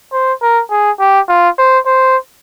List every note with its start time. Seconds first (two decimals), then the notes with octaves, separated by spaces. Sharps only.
0.13 C5
0.42 A#4
0.71 G#4
1.00 G4
1.29 F4
1.58 C5
1.86 C5